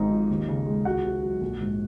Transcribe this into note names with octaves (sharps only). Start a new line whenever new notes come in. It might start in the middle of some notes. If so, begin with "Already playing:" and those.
Already playing: G#1 G#2 D#4
F3
D#2
C#3
G#3
C#2 F#4 F#5
C3
F#3
A#1
G#2